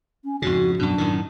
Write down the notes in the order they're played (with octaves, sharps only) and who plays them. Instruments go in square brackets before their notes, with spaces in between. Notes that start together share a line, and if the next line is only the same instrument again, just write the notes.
[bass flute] C#4
[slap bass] F2 G#2 C#3 [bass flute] F#4
[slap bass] F#2 B2 [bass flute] D4
[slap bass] F#2 A2 D#3